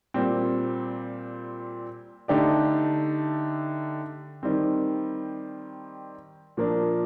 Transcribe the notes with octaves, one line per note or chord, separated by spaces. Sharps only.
A#2 G3 C4
D3 A3 D#4 G4 D5
D#3 G3 C4
A#2 F3 A#3 D4